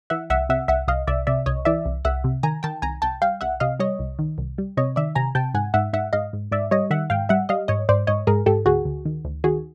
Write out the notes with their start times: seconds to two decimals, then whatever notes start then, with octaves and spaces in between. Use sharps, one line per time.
0.10 E3 E5 F#5
0.30 C2 E5 F#5
0.49 C3 E5 F#5
0.68 C2 E5 F#5
0.88 C2 D#5 F5
1.07 C2 D5 E5
1.27 C3 D5 E5
1.46 C2 C#5 D#5
1.65 E3 D5 E5
1.86 C2
2.05 C2 E5 F#5
2.24 C3
2.43 D#3 G#5 A#5
2.63 D#3 G5 A5
2.82 C2 G#5 A#5
3.02 C2 G5 A5
3.22 G3 F5 G5
3.41 C2 E5 F#5
3.60 C3 D#5 F5
3.79 G3 C#5 D#5
3.99 C2
4.19 D#3
4.38 C2
4.58 G3
4.77 C3 C#5 D#5
4.96 D#3 D5 E5
5.15 C3 G#5 A#5
5.35 C3 G5 A5
5.54 G#2 F#5 G#5
5.74 G#2 E5 F#5
5.93 G#2 E5 F#5
6.13 G#2 D#5 F5
6.33 G#2
6.52 G#2 D5 E5
6.71 G3 C#5 D#5
6.90 D#3 E5 F#5
7.10 G#2 F5 G5
7.29 G3 E5 F#5
7.49 G3 D#5 F5
7.68 G#2 C#5 D#5
7.89 G#2 C5 D5
8.07 G#2 C#5 D#5
8.27 G#2 G#4 A#4
8.46 G#2 G4 A4
8.65 D2 F#4 G#4
8.85 D2
9.05 D#3
9.25 D2
9.44 D#3 F#4 G#4